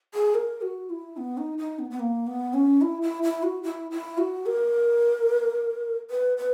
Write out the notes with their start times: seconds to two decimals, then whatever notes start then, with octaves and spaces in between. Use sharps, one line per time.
0.14 G#4
0.34 A#4
0.62 F#4
0.90 E4
1.17 B3
1.37 D#4
1.58 D#4
1.79 B3
1.91 B3
2.00 A#3
2.27 B3
2.54 C#4
2.81 E4
3.02 E4
3.23 E4
3.43 F#4
3.63 E4
3.91 E4
4.18 F#4
4.46 A#4
6.11 B4
6.38 B4